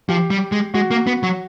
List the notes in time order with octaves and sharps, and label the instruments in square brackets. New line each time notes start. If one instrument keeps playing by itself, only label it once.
[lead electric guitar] F3 [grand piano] G4
[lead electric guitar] G3
G#3
[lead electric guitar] G#3 [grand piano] F#4
[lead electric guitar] A#3
B3
F#3